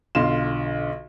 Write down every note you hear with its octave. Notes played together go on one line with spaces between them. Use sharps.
B1 D3 F4 C6 E7